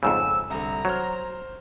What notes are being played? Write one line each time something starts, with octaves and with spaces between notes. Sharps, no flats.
F2 G#2 C#3 E6
C2 D3 A#5
F#3 C5 F6